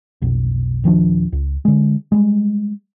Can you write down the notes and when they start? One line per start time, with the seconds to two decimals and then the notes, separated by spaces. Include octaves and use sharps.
0.22 F1 B1
0.84 D#1 D#3 F3 D4
1.32 C#2
1.65 D3 G#3
2.12 G3 G#3